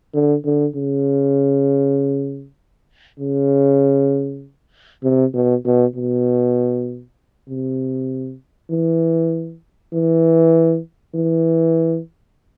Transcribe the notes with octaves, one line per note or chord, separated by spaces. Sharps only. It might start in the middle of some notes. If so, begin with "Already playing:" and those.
D3
D3
C#3
C#3
C3
B2
B2
B2
C3
E3
E3
E3